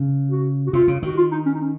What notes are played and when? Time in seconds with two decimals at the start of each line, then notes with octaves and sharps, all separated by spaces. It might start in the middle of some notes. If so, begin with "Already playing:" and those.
Already playing: C#3
0.31 F#4
0.66 F#4
0.73 C3 F4
0.88 C#3
1.03 D#3 F#4
1.17 F4
1.32 D#4
1.46 C#4
1.55 D#4
1.60 C#4